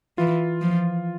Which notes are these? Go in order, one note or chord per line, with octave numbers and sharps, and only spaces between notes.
E3 F4
F3